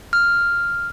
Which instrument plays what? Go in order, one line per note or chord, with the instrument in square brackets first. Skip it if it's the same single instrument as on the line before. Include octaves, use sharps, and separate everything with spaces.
[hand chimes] F6